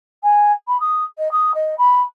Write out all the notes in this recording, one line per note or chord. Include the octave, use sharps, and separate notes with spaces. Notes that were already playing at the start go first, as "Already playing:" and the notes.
G#5
B5
D#6
D#5
D#6
D#5
B5